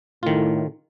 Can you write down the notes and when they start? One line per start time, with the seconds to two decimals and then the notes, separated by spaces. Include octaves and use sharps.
0.23 A2 D#3 F4